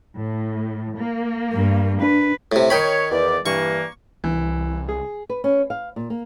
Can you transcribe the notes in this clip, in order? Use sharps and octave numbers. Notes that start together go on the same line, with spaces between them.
A2
A#3
G2
D4 B4
A2 C3
D#3 C#5 G5 B5
E2 D5
G2 E3 A#3 C#6
C2 E3
G#4
B4
C#4
F5
A#2
A#3